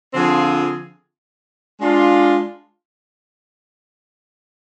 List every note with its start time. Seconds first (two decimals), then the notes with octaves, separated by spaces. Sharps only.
0.14 D3 F3 C4 F4 G#4
1.79 G#3 D4 F4